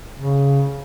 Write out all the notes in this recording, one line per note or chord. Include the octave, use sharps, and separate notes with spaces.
C#3